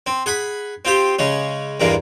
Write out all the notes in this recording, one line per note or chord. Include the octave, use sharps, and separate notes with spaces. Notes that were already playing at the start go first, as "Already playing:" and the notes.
C4
G#4 F#5 B5
C4 F4 G4
C#3 G#3 C#4
E2 G2 A#2 G#3 A#3